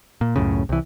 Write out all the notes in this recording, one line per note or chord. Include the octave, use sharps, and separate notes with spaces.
A#2
C#2 F#2 A2 C#3
C2 E3